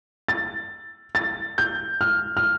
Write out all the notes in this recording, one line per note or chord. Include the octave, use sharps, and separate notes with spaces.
A6
A6
G6
F6
F6